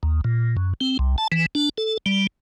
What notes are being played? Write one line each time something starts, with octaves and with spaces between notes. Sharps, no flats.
D#2
A#2
F#2
C4
C2
A5
E3
D4
A4
G3